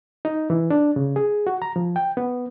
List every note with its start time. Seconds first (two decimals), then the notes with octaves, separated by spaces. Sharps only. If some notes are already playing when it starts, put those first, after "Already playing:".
0.25 D#4
0.50 E3
0.70 D4
0.96 C#3
1.16 G#4
1.47 F#4
1.62 A#5
1.76 F3
1.96 G5
2.17 B3